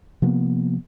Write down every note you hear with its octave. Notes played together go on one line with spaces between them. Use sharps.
C3 F3 A#3 B3